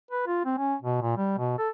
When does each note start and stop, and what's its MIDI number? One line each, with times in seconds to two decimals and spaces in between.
0.11 0.25 71
0.27 0.40 65
0.45 0.56 60
0.57 0.75 61
0.82 1.01 47
1.01 1.16 46
1.17 1.37 55
1.38 1.55 47
1.58 1.69 69